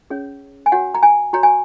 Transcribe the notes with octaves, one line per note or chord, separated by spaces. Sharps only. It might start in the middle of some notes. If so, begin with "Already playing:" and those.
C#4 G#4 C#5
G#5
F#4 C#5 F#5
A#5
G#5
F#4 C#5 A#5
G#5